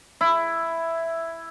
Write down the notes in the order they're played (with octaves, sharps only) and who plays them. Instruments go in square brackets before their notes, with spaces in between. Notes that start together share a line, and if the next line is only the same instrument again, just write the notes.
[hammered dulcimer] E4